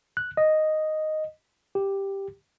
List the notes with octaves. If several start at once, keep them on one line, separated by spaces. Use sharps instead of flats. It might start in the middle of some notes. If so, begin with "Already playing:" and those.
F#6
D#5
G4